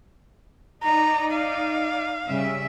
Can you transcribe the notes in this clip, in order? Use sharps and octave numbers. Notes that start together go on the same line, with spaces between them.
D#4 D5 A#5
F5
C#3 G3 E5